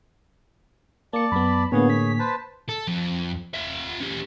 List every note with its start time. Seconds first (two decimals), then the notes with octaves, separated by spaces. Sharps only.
1.13 A#3 D5 A5 C#7
1.32 F#2 B3 B5
1.72 A2 D3 A#3 B3 G#4 C#5
1.90 B6
2.19 B4 C5 A5
2.69 A4
2.87 F2 F3
3.54 F4 E5
4.00 C#4 G4